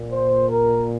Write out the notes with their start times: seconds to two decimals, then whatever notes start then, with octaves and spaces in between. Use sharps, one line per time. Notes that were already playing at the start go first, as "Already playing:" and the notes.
Already playing: A#2
0.12 C5
0.49 A#4